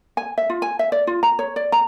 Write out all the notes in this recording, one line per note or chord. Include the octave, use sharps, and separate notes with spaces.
G#5
E5
F4
G#5
E5
D5
F4
A#5
C#5
D5
A#5